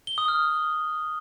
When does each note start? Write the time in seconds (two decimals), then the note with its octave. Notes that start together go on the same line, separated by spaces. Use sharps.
0.07 G7
0.18 D#6
0.28 F6